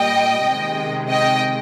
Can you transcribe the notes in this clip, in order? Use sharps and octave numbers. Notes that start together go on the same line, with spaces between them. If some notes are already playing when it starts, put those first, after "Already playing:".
Already playing: A#2 G3 D#5 G5
C3 D#3 G#3
D#5 G5